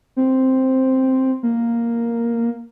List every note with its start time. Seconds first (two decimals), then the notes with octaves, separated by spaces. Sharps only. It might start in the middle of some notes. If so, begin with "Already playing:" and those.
0.17 C4
1.43 A#3